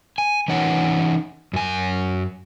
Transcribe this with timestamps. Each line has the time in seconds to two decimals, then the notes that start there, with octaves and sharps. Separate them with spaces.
0.18 G#5
0.48 E3 C#4 D#4 C#5 F#5 G#5
1.53 F#2 G#5